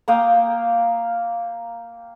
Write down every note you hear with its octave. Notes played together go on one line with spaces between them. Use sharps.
A#3 F5 G5 D#6